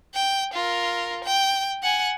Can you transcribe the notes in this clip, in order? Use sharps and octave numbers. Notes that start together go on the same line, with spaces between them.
G5
F4 A#4
G5
F#5 G#5